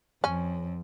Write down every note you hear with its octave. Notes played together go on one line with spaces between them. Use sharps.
F2 C#4